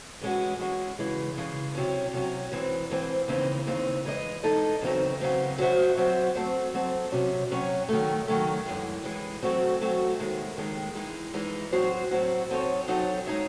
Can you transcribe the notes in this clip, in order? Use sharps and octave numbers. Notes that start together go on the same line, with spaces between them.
E3 G#3 C#4 F#4
E3 G#3 C#4 F#4
C#3 E3 G#3
C#3 E3 G#3
C3 F#3 C#4
C3 F#3 C#4
G#2 E3 C4
G#2 E3 C4
D#2 C#3 E3 C4 D#4
D#2 C#3 E3 C4 D#4
E3 G#3 D#4 A4 D#5
E3 G#3 D#4 A4 D#5
E2 C#3 F#3 C4 D#4
E2 C#3 F#3 C4 D#4
F#3 C4 F#4 C5 E5
F#3 C4 F#4 C5 E5
F#3 A3 C4
F#3 A3 C4
C3 F#3 C#4
C3 F#3 C#4
D#3 F#3 A3
D#3 F#3 A3
F#2 E3 G#3
F#2 E3 G#3
F#3 A3 C4 F#4
F#3 A3 C4 F#4
D#2 D#3 G#3
D#2 D#3 G#3
E3 G#3 D#4
E3 G#3 D#4
A2 F#3 C4 F#4 C5
A2 F#3 C4 F#4 C5
F#3 C4 D#4 A4 C#5
F#3 C4 D#4 A4 C#5
G#3 D#4 G#4 C#5 E5